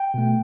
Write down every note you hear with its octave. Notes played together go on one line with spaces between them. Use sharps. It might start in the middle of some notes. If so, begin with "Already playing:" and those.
Already playing: G5
B2 A3